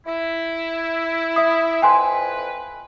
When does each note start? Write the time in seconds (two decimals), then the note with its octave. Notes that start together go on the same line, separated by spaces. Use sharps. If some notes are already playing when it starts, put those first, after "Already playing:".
0.07 E4
1.36 E5 D#6
1.82 F2 B4 G5 G#5 C6